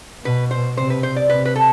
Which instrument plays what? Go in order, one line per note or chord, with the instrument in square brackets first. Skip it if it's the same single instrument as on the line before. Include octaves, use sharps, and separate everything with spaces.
[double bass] B2 [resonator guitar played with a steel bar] B4
[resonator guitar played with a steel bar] C5
[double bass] C3 [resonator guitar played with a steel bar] C5
[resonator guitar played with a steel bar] B4
C5
D5
[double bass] C3 [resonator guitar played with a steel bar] B4
[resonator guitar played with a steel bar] B4
A4